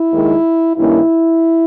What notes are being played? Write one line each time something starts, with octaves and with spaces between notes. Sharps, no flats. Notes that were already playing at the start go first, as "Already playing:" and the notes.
Already playing: E4
D#2 D#3 G#3
G2 D#3 A#3 C#4 E4